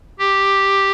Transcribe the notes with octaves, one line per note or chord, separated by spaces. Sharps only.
G4